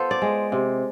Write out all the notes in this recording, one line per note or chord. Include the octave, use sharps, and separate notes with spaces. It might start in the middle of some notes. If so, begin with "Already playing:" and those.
Already playing: B3 F4 A4 C5
D5
G#3
C3